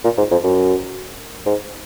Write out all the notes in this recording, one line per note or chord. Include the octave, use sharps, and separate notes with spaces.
A#2
G#2
F2
F#2
G#2